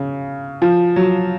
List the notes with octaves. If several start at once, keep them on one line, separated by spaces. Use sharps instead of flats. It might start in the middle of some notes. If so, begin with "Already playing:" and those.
Already playing: C#3
F3
F#3